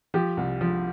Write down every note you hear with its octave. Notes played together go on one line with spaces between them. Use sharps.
F3 G4
C2
F3